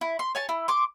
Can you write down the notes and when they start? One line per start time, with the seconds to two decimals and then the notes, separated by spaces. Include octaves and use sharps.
0.01 E4
0.19 C6
0.35 C#5 G#5 A5
0.49 E4
0.68 C6 D6